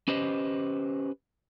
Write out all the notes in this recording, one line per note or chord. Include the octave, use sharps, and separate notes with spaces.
C#4 G4 B4 C5 D#5